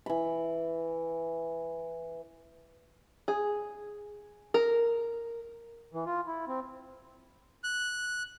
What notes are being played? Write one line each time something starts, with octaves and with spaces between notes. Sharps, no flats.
E3 B5
G#4
A#4
E3
F4
E4
C4
F#6